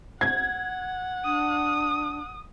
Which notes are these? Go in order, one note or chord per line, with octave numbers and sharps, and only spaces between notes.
F#5 G#6
D4 D#6